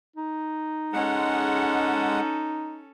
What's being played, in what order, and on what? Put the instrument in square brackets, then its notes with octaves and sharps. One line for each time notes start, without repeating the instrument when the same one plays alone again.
[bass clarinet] D#4
[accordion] G#3 F#5 [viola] C#4 A4